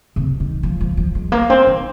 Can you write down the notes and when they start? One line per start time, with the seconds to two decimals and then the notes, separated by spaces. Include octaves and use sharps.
0.16 C3
0.40 D#3
0.63 F3
0.81 F3
0.97 F3
1.15 G#3
1.32 A#3
1.50 C4
1.67 D#4